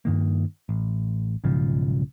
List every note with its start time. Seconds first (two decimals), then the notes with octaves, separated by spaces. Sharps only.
0.05 G2 D#3 A#3
0.69 A1
1.44 B1 G#2 C#3 F3